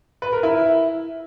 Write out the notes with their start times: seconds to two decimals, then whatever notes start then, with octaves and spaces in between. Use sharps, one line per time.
0.22 B4
0.33 A#4
0.43 E4